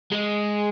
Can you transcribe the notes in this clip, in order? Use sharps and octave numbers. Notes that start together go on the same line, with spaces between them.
G#3